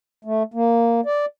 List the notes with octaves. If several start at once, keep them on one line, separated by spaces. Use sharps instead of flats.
A3
A#3
D5